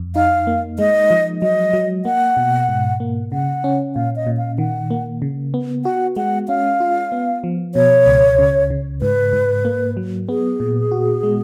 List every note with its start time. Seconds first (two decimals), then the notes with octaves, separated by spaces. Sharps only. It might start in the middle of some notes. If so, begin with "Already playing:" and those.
Already playing: F2
0.16 D#4 F5
0.47 A#3
0.79 G#3 D#5
1.11 F3
1.42 F#3 D#5
1.73 F#3
2.05 A#3 F#5
2.37 B2
2.69 G#2
3.00 A#3
3.32 C#3 F#5
3.64 C#4
3.95 A#2 F5
4.16 D#5
4.27 A#2
4.37 F5
4.58 D#3 F#5
4.91 A#3
5.22 C#3
5.54 B3
5.85 F#4 F#5
6.16 G#3 F#5
6.48 C#4 F5
6.80 F4
7.12 B3
7.44 F3
7.75 B2 C#5
8.06 C#2
8.38 C#3
8.70 C#3
9.02 G#2 B4
9.33 G#2
9.65 A#3
9.97 F#3
10.28 B3 G#4
10.60 A#2
10.91 F#4
11.23 G#3